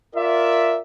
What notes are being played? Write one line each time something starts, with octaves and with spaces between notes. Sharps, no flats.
F4 A#4 D5 E5